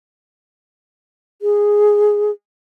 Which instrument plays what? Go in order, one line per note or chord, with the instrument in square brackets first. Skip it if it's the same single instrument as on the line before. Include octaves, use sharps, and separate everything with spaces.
[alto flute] G#4